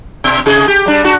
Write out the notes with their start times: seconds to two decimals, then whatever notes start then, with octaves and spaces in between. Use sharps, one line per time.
0.24 B2
0.46 C3 G#4
0.68 G4
0.86 G3 D4
1.04 D4 F#4